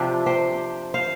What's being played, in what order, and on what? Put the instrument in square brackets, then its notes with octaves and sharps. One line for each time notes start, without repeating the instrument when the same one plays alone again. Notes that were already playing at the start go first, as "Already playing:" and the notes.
Already playing: [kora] C3 F3 C4 D4 G4
G4 C5
C5 F5